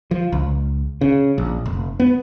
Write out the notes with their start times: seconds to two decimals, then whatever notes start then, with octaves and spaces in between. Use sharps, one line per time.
0.11 F3
0.32 C#2
1.01 C#3
1.38 A#1
1.66 F1
2.00 B3